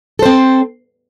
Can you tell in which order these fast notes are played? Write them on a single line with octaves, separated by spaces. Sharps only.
A4 C5 C4